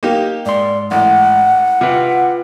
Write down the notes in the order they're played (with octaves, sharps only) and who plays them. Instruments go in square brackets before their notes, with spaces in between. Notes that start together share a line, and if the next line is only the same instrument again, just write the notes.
[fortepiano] A#3 D#4 G4
[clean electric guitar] G#2 C6 [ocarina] D5
[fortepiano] A1 [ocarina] F#5
[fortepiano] C3 [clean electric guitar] F4 B4